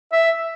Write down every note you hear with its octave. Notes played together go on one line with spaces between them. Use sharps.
E5